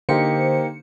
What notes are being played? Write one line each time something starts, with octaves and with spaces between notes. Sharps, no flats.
D3 A#3 D#4 G4 C5 C#7